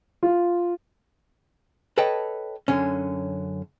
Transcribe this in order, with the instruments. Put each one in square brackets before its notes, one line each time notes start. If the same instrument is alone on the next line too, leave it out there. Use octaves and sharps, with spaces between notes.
[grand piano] F4
[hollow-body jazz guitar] A4 B4 C#5 D#5 G5 A5
F#2 D3 C#4